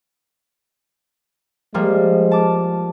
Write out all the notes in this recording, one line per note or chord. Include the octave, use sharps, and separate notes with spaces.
F3 G3 G#3 A#3
A5 D6